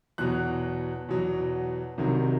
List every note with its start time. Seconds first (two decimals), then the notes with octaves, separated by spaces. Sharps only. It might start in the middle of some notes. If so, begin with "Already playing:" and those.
0.18 E2 B2 F#3 F#6
1.09 E2 B2 F#3
1.98 C2 C3 D#3 F#3